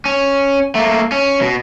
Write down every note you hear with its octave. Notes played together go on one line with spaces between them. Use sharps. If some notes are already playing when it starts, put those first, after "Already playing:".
C#4
A3 A#3
C#4
B2